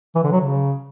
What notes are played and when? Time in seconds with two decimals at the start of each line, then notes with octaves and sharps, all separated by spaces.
0.15 E3
0.23 D3
0.32 F#3
0.40 C#3